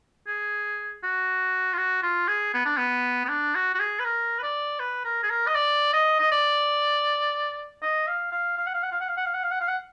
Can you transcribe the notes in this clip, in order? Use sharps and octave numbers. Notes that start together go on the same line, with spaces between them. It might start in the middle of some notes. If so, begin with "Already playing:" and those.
G#4
F#4
F4
F#4
F4
G#4
B3
D4
B3
B3
D4
F#4
F#4
G#4
B4
A#4
B4
D5
B4
A#4
G#4
A#4
D#5
D5
D#5
D#5
D5
D#5
F5
F5
F5
F#5
F5
F#5
F5
F#5
F5
F#5
F5
F#5
F5
F#5
F5
F#5